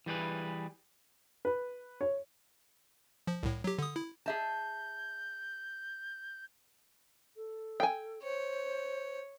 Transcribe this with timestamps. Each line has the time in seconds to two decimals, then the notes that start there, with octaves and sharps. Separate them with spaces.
0.06 E3 G3 G#4 B4
1.45 B4
2.01 C#5
3.27 F3
3.43 C2 A2
3.64 F#3 G4
3.78 D3 D#6
3.96 E4
4.26 G#4 E5 A5 G6
7.36 A4
7.80 G5 G#5
8.23 C5 C#5